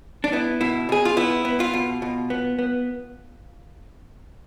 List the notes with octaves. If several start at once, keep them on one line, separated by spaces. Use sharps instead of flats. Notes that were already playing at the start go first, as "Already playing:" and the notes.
D4
B3 E4
B2 E4
B2 G#4
F4
B3 E4
B3
F4
B2
B2
B3
B3